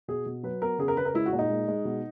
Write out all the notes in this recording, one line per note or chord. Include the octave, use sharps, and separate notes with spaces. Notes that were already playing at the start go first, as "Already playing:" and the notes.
B2 G#4
B2
F#3 B4
B3 A#4
C#3 G#4
A#4
C#3 B4
A#4
G#3 E4
F#4
A#2
D#4
G#3
G#3
B2